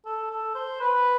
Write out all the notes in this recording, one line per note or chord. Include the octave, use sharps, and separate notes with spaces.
A4
A4
C5
B4